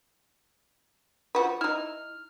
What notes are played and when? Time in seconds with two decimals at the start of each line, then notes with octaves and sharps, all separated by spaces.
1.35 F3 F#4 B4
1.61 D#4 E4 F6